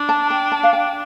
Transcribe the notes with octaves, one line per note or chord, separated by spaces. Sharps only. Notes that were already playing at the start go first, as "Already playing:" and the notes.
Already playing: D4
A5
G5
A5
F5
G5